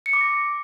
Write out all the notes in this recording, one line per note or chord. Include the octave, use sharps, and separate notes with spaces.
C#7
D6
A#6